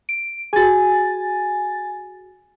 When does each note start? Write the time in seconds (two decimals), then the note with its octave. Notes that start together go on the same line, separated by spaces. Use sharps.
0.09 D7
0.53 F#4 G#4 G#5 A6